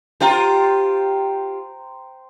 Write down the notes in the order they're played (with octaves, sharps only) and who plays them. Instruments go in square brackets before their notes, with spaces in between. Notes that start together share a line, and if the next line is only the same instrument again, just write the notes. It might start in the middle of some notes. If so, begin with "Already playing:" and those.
[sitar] F4 G4 [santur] C5 G5 A#5